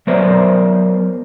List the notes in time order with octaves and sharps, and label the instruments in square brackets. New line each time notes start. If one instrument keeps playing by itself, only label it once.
[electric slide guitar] F#3 B3 A#4 C5 D5 E5